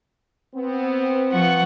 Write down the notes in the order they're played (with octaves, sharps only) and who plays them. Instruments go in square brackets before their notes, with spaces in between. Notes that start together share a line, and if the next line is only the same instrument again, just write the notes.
[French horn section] B3 C4
[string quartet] F3 F#5 C#6